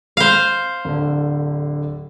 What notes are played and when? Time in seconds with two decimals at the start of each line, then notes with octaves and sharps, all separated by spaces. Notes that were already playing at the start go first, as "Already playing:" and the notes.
0.17 C5 F5
0.85 D1 D3